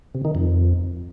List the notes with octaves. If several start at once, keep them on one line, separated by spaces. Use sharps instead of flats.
C3
D#3
F2